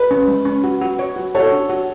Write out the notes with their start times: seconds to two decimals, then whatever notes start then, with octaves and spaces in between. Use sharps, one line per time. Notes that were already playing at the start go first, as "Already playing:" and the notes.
Already playing: B4
0.11 C#4
0.28 G#3
0.45 C#4
0.64 F#4
0.82 F#4
0.99 C#5
1.16 F#4
1.35 F#4 A4 C#5
1.52 D4
1.69 F#4